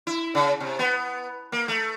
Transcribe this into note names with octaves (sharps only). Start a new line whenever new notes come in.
E4
C#3
C3
B3
A#3
A3